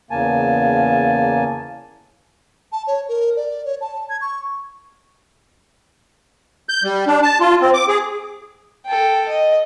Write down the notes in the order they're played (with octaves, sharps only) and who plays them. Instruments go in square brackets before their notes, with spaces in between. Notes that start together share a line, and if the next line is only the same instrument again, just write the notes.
[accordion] E2 C#3 A#3 G#5 A5
[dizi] A5
C#5
A#4
D5
C#5
A5
G#6
C#6
[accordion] G6
G3
D4
A5
F4
C4
D6
G#4
[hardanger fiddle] A4 G5
D#5